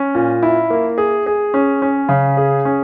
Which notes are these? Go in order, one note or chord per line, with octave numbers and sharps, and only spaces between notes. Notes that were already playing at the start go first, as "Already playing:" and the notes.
Already playing: C#4
A#2
E4
A#3
G#4
G#4
C#4
C#4
C#3
G#4
C#4